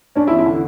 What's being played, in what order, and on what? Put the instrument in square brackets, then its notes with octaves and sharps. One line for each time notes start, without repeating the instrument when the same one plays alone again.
[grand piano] C#4 [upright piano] D4
[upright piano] E4
[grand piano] E2
[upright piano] E4
[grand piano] D3